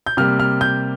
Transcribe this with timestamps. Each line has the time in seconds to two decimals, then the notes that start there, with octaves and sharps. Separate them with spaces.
0.07 G6
0.17 C3 G3 A#3 F6
0.40 F6
0.61 G6